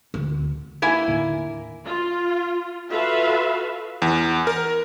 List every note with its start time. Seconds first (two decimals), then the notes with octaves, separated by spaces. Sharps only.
0.14 D2
0.82 A#3 E4 G#5
1.07 D#2 A2 D3
1.85 F4
2.90 F4 F#4 A4 B4 E5 F5
4.02 E2
4.47 A#4